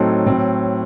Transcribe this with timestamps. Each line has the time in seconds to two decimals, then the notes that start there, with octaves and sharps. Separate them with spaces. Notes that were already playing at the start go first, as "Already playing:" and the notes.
Already playing: A2 F#3 C4 D#4 A4
0.26 A2 F#3 C4